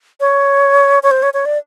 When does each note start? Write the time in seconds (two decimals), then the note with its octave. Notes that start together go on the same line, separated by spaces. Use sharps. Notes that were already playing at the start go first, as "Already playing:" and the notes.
0.20 C#5
1.03 C#5
1.11 C5
1.22 C#5
1.34 C#5
1.45 D5